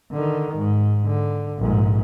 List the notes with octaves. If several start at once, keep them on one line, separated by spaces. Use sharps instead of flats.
D3 D#3
G#2
D3
A#1 G#2